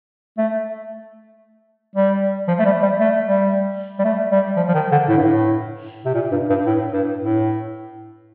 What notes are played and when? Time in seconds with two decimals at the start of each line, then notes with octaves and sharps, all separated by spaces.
0.38 A3
1.96 G3
2.48 F3
2.60 A3
2.65 G3
2.82 G3
3.00 A3
3.26 G3
3.99 G3
4.04 A3
4.32 G3
4.57 F3
4.69 F3
4.74 D#3
4.92 D3
5.09 A2
5.17 G2
5.24 A2
6.05 C3
6.14 A#2
6.32 G2
6.50 G2
6.66 A2
6.93 G2
7.18 A2